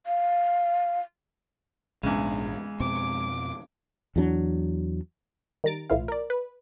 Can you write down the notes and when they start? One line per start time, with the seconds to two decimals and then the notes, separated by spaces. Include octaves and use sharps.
0.07 F5
2.03 A#1 E2 G#2 C#3 G#3 D4
2.80 F2 B2 C4 D6
4.16 E2 E3 F#3 D4
5.64 D#3 G3 A#5 A6 D7
5.90 B1 A2 E3 E4 F4 F5
6.08 A#4 D5
6.30 B4